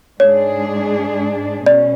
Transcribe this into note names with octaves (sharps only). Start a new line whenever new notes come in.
G#2 G#3 D4 G#4 C#5
B2 C#4 D5